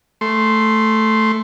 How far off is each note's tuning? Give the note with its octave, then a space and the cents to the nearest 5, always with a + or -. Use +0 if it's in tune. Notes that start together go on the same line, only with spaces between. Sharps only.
A3 +0 C6 +0